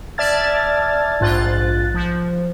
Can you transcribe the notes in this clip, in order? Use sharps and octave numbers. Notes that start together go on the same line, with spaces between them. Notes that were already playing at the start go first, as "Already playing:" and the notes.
D5 E5 A5 F6 G#6 A6
A#1 G#2 F4 F#6 A6
F3